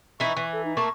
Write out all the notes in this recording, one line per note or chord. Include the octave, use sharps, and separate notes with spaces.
E3 D#4 E4 C#6
E3
A4
D#4
A3 A#3 A5 C#6